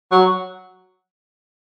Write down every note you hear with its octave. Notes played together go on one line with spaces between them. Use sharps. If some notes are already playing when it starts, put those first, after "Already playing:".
F#3